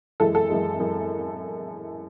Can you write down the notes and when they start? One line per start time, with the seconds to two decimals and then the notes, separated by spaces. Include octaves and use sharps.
0.20 F#2 E3 G#3 A4
0.35 A4
0.50 F#2 E3 G#3
0.80 F#2 E3 G#3